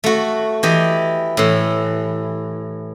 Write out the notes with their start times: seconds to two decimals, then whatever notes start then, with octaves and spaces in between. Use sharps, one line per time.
0.04 A3 F#4
0.63 E3 G4 D#5
1.37 A2 E3